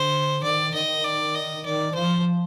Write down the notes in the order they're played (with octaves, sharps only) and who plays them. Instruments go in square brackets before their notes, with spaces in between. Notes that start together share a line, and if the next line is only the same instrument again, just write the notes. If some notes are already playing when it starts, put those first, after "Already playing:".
Already playing: [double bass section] D3 [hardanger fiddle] C5
[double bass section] D#3 [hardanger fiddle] D5
[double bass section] D#3 [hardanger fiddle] D#5
[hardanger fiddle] D5
D#5
[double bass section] D#3 [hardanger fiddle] D5
[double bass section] F3 [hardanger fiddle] C5